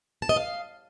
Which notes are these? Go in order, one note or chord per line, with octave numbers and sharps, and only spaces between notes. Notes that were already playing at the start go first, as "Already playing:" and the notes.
A5
D#5
F5